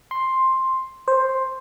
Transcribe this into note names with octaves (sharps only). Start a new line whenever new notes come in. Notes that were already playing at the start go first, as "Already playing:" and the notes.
C6
C5